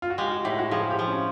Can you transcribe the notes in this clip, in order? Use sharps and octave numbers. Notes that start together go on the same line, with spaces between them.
F4
F#4
G#3 G4
F#4
A2 G4
F#4
F3 G#4
G4
F3
C#4